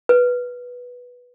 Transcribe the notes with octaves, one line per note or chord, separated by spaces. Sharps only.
B4